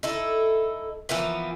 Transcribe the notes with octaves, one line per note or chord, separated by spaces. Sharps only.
D#4 E4 A4
E3 F3 A#3 B3